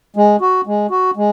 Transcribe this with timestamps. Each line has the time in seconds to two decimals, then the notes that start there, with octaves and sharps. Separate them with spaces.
0.16 G#3
0.41 F#4
0.67 G#3
0.91 F#4
1.17 G#3